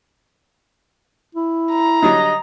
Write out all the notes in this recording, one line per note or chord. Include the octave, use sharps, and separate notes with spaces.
E4
A#5
D3 F#3 G3 D#5